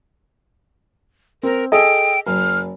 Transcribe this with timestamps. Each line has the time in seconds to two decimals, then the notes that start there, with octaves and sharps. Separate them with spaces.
1.43 C4 A#4
1.72 G#4 A4 D#5 G5
2.27 F#1 F6